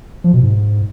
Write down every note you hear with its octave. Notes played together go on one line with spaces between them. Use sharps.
F3
B2
G#2